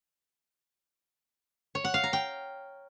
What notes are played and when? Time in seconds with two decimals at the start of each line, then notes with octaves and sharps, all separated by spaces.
1.75 C#5
1.84 F#5
1.94 F5
2.04 A#5
2.13 G5